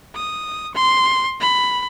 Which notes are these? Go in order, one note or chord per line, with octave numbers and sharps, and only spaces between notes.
D#6
C6
B5